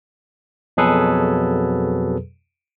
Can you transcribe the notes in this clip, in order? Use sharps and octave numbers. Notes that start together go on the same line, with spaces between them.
F2 B2 F#3 G#4 A4 B4